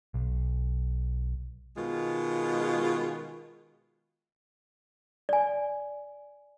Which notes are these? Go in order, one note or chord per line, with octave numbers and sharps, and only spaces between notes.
B1
B2 D#3 G#3 F4
D5 G#5